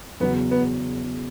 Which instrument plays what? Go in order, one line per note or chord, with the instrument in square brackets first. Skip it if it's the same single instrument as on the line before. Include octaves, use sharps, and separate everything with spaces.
[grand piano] E2 C#3 F#3 C#4 [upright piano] B3
[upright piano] B3